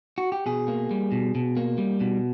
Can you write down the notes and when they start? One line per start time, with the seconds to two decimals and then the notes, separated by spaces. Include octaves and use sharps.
0.18 F#4
0.32 G4
0.46 B2 G#4
0.68 A#3
0.91 G3
1.12 B2
1.35 B2
1.57 A#3
1.78 G3
2.00 B2